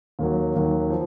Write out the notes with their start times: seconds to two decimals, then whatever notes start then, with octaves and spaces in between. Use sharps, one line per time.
0.19 D#2 D#3 F#3
0.55 D#2 D#3 F#3
0.90 F3